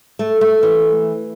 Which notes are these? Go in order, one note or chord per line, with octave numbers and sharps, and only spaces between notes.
A3
A3
E3